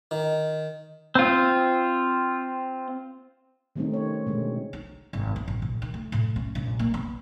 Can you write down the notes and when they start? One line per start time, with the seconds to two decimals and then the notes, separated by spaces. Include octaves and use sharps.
0.11 D#3
1.15 C4 F4
3.76 D#3 G3 A3 C4 C#4 D#4
3.93 C#5
4.14 C#4
4.27 B2 D3 G#3
4.73 D#4
5.13 G#1
5.36 B3
5.48 A1
5.62 A#1
5.82 D#3
5.94 A3
6.12 A2
6.36 C#4
6.55 A#1
6.79 A#3
6.94 B3